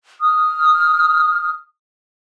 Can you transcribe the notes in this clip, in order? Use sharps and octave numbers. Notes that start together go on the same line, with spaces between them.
D#6 F6